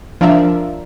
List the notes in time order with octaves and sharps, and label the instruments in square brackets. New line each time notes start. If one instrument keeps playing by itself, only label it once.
[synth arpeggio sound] F3 D4 F4 A#4 D5 E5